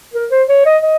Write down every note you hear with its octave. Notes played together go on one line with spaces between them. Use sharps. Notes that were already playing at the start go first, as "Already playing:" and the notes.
A#4
C5
C#5
D#5
D#5